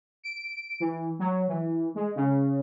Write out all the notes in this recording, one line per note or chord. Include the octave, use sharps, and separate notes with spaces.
D7
E3
F#3
E3
G#3
C#3